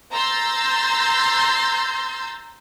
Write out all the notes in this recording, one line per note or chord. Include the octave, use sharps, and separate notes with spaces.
A#5 C6 E6 G6 A6